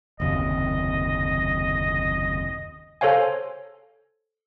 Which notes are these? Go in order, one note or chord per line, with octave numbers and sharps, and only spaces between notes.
F#1 D#2 C3 D#5
A4 C5 C#5 F5 G#5